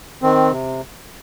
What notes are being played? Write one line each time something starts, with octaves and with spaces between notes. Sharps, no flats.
D#3 C4
C3